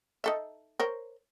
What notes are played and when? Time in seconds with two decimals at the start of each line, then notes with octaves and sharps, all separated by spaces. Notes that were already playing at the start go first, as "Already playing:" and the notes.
0.24 D#4 A4 E5
0.80 A#4 C5 C#5